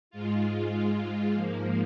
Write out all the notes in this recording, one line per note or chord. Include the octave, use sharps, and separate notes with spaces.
G#2 G#3 F4
G#2 F3 A#3